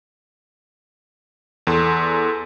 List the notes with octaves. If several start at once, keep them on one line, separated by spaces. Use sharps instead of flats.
E2 A4 C6